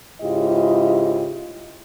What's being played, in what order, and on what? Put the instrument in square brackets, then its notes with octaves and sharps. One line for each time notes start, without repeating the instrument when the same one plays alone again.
[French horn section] G#2 C#3 E4 F4 G4 D#5